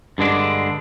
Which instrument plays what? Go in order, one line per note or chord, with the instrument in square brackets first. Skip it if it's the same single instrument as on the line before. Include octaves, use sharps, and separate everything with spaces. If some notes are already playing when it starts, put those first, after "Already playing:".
[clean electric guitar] G2 D3 G#3 D4